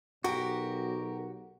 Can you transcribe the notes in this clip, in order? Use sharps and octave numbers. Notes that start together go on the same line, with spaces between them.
B1 F#4 G4 A#4